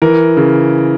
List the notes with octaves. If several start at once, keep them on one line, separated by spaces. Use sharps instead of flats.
E3 A#4
C#3